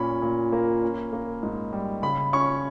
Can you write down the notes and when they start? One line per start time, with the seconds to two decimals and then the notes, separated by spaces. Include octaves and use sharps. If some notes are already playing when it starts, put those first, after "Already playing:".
Already playing: A#2 C#4 B5
0.22 A#2
0.52 A#3
0.82 C#4
1.13 A#3
1.43 G#2
1.73 G3
2.02 C#3 B5
2.33 C#4 C#6